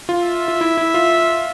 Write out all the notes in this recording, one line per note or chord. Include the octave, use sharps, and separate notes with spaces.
F4
E5
F4
E4
E4
F4